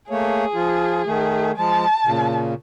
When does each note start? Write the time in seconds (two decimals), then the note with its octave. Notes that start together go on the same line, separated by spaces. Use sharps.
0.10 A3 A#3 G#4 C#5
0.54 F3 F4
1.07 D#3 A3
1.57 F3 G#3 A5
2.05 A#2 C#3